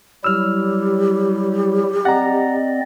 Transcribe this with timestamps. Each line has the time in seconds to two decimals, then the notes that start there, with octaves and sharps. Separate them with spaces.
0.24 F#3 G3 E4 G4 E6 F6
2.05 C4 D5 D#5 F#5 A#5